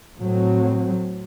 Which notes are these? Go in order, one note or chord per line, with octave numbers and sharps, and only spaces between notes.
A2 F#3 C4